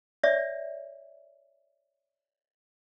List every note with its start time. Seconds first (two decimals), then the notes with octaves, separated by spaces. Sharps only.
0.23 C#5 D5 E5